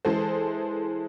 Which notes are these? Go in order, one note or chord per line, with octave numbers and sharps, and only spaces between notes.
E3 G#3 G#4 A4 C5